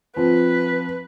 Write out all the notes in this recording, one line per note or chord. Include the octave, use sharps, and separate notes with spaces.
F3 C4 B4